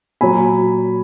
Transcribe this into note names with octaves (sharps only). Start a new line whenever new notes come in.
A#2 F#3 G#5 B5